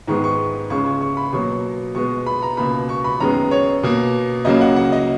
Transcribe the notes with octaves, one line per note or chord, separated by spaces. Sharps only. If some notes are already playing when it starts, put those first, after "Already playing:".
G#2 D#3 G#3 B3 C#6
C#6
C#2 C#3 G#3 C#6
C#6
C#6
B5
B2 F#3 A#3 C#6
B2 G#3 B3 C#6
B5
A#5
C#2 B2 A#3 B5
C#6
B5
F#2 D#3 G#3 B3 A#5
C#5
B2 A#3
C#2 C#3 F#3 A#3 D#5
F#5
F#5
D#5